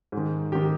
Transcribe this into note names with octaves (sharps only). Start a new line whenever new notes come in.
G#2 D#3
G#2 D#3 G4